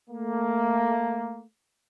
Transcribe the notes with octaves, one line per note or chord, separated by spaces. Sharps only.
A3 A#3